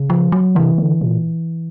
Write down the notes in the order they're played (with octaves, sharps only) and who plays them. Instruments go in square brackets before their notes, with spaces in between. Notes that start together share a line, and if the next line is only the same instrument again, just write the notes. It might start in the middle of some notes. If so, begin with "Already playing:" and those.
Already playing: [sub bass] C#3
[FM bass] F3
F#3
[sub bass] C3 [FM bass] E3
[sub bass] D3
A#2